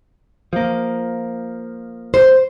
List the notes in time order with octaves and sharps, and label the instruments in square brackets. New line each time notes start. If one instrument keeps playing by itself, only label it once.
[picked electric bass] F3 A#3
[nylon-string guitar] C5